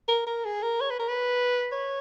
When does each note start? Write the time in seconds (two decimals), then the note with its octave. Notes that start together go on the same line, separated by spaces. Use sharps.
0.08 A#4
0.26 A#4
0.45 G#4
0.62 A#4
0.81 C#5
0.90 B4
0.99 A#4
1.08 B4
1.72 C#5